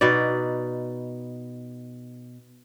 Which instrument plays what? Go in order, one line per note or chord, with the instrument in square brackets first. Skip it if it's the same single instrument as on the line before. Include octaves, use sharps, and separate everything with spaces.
[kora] B2 D#4 B4 D5